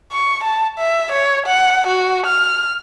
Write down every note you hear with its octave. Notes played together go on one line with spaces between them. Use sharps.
C#6
A5
E5
C#5
F#5
F#4
F6